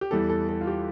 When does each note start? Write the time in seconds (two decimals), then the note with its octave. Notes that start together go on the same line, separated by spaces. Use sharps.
0.01 G4
0.11 E2 E3 G3 A4
0.29 A4
0.49 A4
0.61 F4
0.67 G4